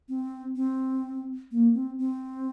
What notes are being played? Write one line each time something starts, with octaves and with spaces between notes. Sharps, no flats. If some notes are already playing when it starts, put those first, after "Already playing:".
C4
C4
A#3
C4
C4